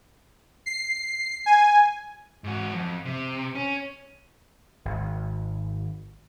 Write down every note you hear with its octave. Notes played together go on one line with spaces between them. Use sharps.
C7
G#5
G#2 F#4
F2
C3
C#4
G#1